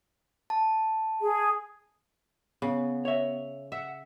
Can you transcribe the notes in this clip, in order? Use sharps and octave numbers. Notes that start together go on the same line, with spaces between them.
A5
G#4
C#3 B3
C#5 E5
E5 F#5